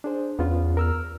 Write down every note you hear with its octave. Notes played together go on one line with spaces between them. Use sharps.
D4 G#4 C5
E2 B3 C#4 F4
A#4 E6 F6